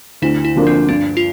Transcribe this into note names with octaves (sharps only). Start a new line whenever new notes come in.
D2 E4
E4
D3 F3 A#3 D4
C4
G2 D4
F4